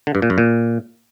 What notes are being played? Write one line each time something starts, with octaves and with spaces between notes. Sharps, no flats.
D3
G2
A#2
F#2
A#2